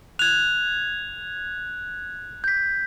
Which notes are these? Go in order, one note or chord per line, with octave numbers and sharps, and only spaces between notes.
F#6 G#6 F7
G6 B6